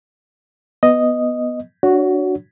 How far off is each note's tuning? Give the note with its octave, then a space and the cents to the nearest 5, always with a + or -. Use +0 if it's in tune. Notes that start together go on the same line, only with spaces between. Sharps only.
B3 +0 D#5 +0
D4 +0 F#4 +0 C#5 +25